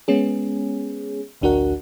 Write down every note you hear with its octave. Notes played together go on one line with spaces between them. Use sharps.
G#3 B3 C#4 G#4
A1 D2 D4 F#4 A#4 F#5